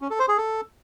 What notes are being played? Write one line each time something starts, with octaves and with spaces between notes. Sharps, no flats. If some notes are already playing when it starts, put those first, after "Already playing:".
C#4
A4
C5
G#4
A4